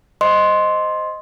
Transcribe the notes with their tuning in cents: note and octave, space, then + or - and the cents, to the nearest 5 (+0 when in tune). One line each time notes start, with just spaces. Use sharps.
C5 +0 D#5 +0 C6 +5